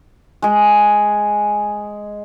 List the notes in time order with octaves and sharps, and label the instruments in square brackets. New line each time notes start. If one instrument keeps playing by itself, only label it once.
[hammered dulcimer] G#3 G#4